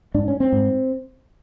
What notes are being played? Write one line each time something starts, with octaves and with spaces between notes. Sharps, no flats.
G#2 D4
C#4
C4
G#2